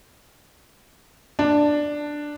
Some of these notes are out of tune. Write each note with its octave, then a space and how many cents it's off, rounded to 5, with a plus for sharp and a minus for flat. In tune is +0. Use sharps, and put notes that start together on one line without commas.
D4 +5